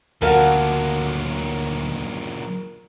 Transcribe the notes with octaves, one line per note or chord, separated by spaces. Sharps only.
D2 A#2 F#3 F#4 A#4 F5 A5